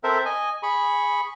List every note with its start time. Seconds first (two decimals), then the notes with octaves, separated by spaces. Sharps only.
0.04 C4 A4 A#4 C5 E5
0.25 D#5 G#5
0.63 G#4 B5 C#6